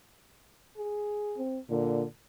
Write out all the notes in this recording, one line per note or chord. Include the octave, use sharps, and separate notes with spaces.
G#4
C4
A#2 D3